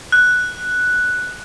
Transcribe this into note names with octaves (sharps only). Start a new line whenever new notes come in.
F#6